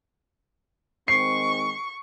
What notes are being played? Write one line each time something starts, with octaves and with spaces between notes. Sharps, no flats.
D#3 G#3 C4 C#6 C7